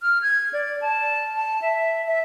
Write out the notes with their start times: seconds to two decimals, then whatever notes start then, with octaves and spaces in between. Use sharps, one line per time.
0.02 F6
0.22 G#6
0.53 D5
0.81 A5
1.35 A5
1.62 E5
2.07 E5